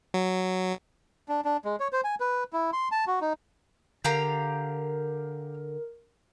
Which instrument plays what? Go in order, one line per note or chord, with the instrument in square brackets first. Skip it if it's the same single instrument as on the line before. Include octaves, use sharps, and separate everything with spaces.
[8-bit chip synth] F#3
[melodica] D4
D4
G#3
C#5
C5
G#5
B4
E4
C6
A5
F#4
D#4
[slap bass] D3 [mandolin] G4 F5 A#5 [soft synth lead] A#4